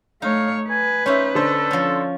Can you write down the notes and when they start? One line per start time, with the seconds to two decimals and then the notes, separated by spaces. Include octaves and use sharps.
0.22 A3 D#4 C#5 F5
0.70 B4 G#5
1.06 C#4 D#4 C5 C#5 E5
1.35 D3 D4 A4 C5
1.71 F3 C#4